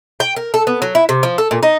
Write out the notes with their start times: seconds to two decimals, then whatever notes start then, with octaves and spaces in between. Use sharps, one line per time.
0.20 G5
0.36 A#4
0.54 A4
0.67 B3
0.82 F#3
0.95 E4
1.09 C3
1.23 F3
1.38 A4
1.51 A#2
1.63 D#4